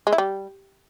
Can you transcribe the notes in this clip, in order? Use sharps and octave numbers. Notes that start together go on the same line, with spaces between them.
G#3
E4
G3